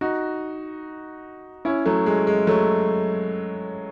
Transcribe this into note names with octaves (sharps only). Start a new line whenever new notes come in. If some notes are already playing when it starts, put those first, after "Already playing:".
D#4 F#4
C#4 E4
F#3 A3
G#3
G#3
F#3 A3